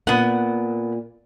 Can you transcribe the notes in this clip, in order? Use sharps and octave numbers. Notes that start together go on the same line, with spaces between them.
A#2 B3 F#5